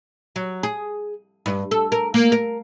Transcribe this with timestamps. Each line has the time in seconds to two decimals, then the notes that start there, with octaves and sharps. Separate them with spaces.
0.36 F#3
0.63 G#4
1.46 G2
1.71 A4
1.92 A#4
2.14 A#3
2.32 A#4